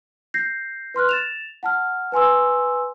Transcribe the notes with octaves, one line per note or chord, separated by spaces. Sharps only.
G6 A#6 C7
B4 C6 F6 F#6
A6 E7 F7
F#5 A5 F6
B4 G#5 C6 E6